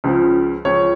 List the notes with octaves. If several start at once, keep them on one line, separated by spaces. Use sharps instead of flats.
C#2 C#3 F3
C#2 C#3 F3 C#5